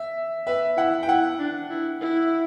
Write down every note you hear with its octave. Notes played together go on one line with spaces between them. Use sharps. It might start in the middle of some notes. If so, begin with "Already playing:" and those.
Already playing: E5
B4 E5
E4 F#5
G5
E4 F#5
D4
E4
E4